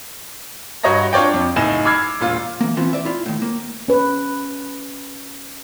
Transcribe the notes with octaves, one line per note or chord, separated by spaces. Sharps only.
G2 F#4 C#5 D#5 A#5 A#6
D4 F4 C#5 D5 G5
F2
F#1 A2 D#4 G#5 E7
B5 D6 E6 F6 G#6 C7
E1 A#2 F4
E3 A#3
E3 B3 C4 E4 F4
D5 E5
E4 F4
D#2 A2
A#3
C#4 B4